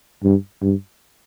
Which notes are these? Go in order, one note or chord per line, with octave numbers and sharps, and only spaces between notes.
G2
G2